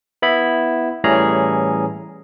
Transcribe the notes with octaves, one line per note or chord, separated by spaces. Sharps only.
B3 E4 B5
A2 E3 G3 C#4 G#4 A#5